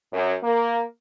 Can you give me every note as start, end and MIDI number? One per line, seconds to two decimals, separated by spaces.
0.13 0.35 42
0.43 0.82 58